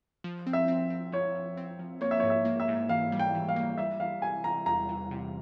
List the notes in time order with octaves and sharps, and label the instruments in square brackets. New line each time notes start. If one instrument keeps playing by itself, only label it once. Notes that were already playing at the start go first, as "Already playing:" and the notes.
[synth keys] F3
C4
[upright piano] E5
[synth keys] C4
C4
[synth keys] F3 [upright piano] C#5
[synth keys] F3
C4
F3
[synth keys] A#3 [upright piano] C#5
[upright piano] E5
[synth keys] G#2 [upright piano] C#5
[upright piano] E5
[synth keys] A#3
[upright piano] E5
[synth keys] G#2
[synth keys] E3 [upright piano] F5
[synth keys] G3
[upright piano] G5
[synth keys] E3
[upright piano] F5
[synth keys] A#3
[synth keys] G3 [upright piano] E5
[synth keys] E3 [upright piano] F5
[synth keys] C3 [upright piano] G#5
[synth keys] E3 [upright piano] A#5
[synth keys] E2 [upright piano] A#5
[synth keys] E3
C3